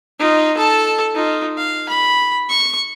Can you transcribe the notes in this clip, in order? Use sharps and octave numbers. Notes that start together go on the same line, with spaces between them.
D#4 F4
A4 A5
D#4 F4
F5
B5
C#6